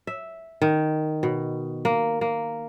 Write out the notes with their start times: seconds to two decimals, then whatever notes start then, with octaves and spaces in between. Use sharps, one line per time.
0.07 E5
0.62 D#3
1.23 B2
1.85 A#3
2.21 A#3